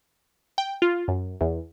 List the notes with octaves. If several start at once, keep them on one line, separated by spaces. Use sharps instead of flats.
G5
F4
F#2
E2